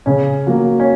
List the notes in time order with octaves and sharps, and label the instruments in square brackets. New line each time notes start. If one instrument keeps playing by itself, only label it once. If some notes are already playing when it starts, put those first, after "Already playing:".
[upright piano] C#3 [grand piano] C#4
[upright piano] F#3 A#3
[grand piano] C#4